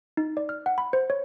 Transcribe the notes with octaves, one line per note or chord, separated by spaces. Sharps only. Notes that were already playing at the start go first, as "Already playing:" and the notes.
D#4
D5
F6
F#5
B5
C5
C#5